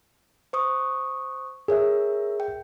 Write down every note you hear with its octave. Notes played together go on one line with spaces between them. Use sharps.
C5 C#6 D#6
G#4 A#4 C#5 E5
G5